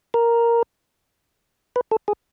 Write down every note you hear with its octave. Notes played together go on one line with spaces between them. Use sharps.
A#4
B4
A4
G#4